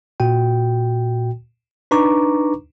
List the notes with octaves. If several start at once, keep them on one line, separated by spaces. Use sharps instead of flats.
A#2 F#4 G5
D4 D#4 B4 A#5 C#6 D6